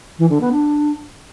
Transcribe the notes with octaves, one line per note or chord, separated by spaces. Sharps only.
E3
D3
B3
D4